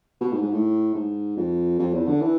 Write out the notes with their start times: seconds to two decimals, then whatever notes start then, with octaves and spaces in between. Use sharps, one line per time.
0.21 B2
0.32 G#2
0.42 G#2
0.53 A2
0.94 G#2
1.37 F2
1.79 F2
1.93 E2
2.07 D3
2.21 E3